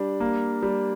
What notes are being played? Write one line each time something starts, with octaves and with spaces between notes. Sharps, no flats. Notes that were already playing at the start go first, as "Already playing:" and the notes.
Already playing: G3 D4
A#3
G3